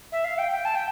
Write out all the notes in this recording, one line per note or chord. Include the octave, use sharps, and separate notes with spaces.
E5
F5
G5
G5
A5
G5